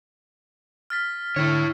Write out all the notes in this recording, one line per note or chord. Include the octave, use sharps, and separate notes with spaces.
F6 A6 B6
D3 E4 C#5